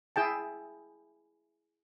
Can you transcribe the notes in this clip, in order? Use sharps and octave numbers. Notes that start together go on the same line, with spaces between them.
E4 G#4 G5 A5